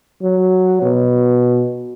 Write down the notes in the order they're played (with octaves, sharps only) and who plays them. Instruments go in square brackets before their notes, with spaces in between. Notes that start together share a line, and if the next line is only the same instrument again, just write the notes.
[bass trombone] F#3
B2